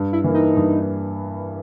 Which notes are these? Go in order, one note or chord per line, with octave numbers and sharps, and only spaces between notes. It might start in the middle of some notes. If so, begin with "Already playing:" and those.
Already playing: G2
E4
E3 A#3 E4
D#4
G2